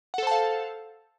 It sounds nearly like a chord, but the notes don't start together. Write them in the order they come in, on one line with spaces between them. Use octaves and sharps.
F#5 A4 C5 A5 F5